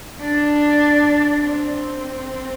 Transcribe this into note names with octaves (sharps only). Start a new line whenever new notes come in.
D4
C4